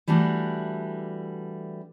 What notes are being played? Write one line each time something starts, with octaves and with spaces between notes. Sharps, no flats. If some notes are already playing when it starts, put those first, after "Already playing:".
E3 G3 A3 D4 F#4